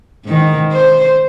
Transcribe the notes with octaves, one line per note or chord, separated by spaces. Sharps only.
G#2 D#3
C5